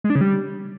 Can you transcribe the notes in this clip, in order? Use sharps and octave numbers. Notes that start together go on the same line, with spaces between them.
G#3
D4
C#3
G3